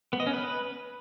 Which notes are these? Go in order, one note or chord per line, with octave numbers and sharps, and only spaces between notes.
B3
D#5
C#4
B4